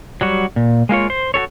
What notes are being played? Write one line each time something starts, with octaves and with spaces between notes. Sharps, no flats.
F#3 G3 F#4
A#2
G#3 A#3 F4 C#5
C5
F#4 G4 A4 C#5